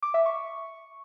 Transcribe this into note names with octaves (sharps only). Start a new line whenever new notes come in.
D6
E5
C#6